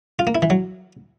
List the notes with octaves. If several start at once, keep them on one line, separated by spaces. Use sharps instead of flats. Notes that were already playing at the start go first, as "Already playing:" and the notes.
F4
A#3
E4
E3
F#3